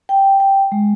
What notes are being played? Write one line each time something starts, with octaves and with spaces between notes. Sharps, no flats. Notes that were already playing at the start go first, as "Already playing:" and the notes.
G5
G5
G#3